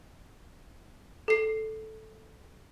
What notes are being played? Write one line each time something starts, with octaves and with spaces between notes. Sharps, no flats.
A4 C7